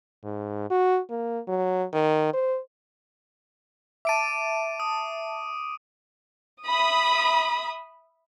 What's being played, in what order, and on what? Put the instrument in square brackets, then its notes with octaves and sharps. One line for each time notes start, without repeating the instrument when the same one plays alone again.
[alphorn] G#2
F#4
A#3
F#3
D#3
C5
[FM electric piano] E5 A5 [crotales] D6 D7 D#7
[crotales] D#6
[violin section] E5 B5 D#6